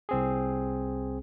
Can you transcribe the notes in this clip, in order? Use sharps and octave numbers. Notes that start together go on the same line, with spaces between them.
C2 C4 G#4